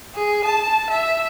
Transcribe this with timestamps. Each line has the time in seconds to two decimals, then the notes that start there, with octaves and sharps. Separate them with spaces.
0.15 G#4
0.45 A5
0.90 E5